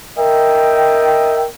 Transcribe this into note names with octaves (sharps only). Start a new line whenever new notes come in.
A#4 D#5 E5 G5